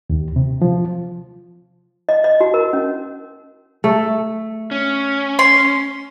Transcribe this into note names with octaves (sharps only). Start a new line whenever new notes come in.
D#2
C3
F3
D#5
D#5
F#4
A#4
C#4
A3
C#4
C6